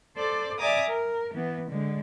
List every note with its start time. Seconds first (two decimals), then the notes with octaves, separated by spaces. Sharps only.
0.15 A4 C5 D5
0.58 D5 E5 G#5 A#5 D6 D#6
0.88 A#4
1.33 E3 B3
1.68 D3 G#3